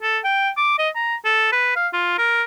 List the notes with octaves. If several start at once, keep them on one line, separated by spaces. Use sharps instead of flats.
A4
G5
D6
D#5
A#5
A4
B4
F5
F4
A#4